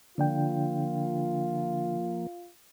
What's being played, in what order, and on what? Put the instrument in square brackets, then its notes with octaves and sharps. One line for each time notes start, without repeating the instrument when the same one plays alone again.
[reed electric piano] D3 D4 G5 [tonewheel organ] F3 A#3 [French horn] F4